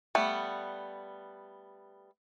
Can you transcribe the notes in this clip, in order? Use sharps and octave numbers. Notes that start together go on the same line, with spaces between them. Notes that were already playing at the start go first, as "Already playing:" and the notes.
G3 A3 B3